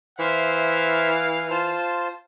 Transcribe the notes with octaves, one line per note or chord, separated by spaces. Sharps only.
E3 C5 E5 F5
F4 C5 A5